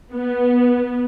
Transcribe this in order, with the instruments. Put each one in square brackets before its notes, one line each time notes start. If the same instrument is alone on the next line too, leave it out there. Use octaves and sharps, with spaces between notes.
[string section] B3